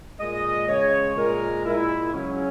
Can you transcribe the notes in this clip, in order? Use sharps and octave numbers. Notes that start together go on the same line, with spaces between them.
A#2 G#3 D#5
C#3 G#3 C#5
A#2 G#3 A#4
A#2 G#3 E4
C#3 F#3 C#4